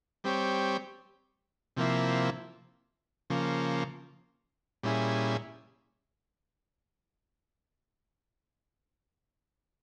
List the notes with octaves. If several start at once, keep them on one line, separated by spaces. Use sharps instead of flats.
G3 C4 G4 C#5
C3 F3 A#3 E4
C#3 F3 A#3
A#2 G3 C#4 E4 G#4